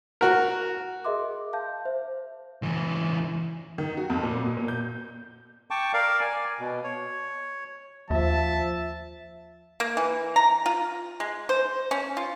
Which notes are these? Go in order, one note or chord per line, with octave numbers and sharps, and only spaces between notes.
F#4 A#4
G#4 A#4 D#5 E5 C6 D6
F5 A5 G6
C5 E5
C#2 E3
D#3
F#4
F2
A#2
B2
A#2
G6
G5 A5 C#6 D6
A#4 D5 F5
D5 G#5
B2
C#5
D#2 F3 E5 A5
A#3
E3
A#5
F4
G#3
C5
C#4
F4